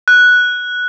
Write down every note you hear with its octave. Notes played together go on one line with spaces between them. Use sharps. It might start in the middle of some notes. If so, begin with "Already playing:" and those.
F#6